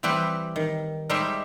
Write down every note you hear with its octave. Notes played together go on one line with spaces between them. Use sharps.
E3 G3 C4 G4 B4
D#3
G3 G#3 D#4 G4 C5 E5